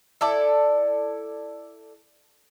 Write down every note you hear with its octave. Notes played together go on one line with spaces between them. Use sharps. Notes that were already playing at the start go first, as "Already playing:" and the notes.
E4 A4 D5